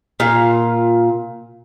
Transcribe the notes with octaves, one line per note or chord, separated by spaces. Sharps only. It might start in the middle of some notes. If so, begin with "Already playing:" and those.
A#2 F4 F5